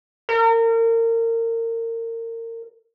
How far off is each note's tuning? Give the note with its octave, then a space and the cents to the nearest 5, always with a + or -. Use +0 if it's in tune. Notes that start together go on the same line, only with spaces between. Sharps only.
A#4 -30